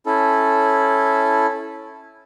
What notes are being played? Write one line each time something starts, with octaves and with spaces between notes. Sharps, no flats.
C#4 E4 A4